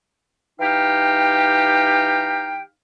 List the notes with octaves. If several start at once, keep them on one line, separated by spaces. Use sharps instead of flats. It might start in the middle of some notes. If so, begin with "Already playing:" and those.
E3 D#4 G4 F5 G5